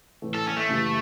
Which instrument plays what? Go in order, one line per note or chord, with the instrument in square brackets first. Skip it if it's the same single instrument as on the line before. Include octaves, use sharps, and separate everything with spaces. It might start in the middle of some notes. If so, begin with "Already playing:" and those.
[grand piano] A2 E3 A3
[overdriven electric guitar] A4
C#4
A3
[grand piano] F#2 C#3 E3 G3